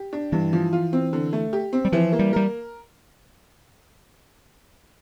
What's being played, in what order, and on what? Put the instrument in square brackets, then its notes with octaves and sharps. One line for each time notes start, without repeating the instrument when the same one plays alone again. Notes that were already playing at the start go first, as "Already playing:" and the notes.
Already playing: [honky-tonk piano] G4
D4
[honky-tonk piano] G2 [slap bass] E3
[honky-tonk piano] F3
F4
C4
D3
A3
G4
C4
[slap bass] G3
[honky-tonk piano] E3 [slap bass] F3
[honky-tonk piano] A#3
[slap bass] G3
[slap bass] G3 [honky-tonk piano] A#4